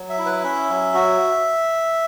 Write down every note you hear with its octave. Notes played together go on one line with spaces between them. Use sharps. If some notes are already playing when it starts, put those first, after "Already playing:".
Already playing: F#3
E5
E4
B4
C#4 E5
F#3
F#4